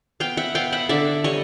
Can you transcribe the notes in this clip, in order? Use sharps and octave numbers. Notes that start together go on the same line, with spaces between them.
B3 F5 G5
E5 F#5
B3 F5 G5
E5 F#5
D3 D5 E5
G3 C#5 D#5